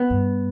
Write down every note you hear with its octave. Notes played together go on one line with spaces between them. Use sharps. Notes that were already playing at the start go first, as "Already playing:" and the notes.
Already playing: B3
G2